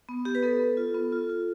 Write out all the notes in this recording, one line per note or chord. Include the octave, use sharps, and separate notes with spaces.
B3
B3 G4
B4
B3 A4
B3
F4
B3
F4
F4